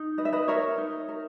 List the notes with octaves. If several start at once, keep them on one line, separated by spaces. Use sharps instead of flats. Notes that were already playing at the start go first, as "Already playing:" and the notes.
Already playing: D#4
B4 D#5
E5
B4 D#5
A#4 C#5 E5
D#4
A#4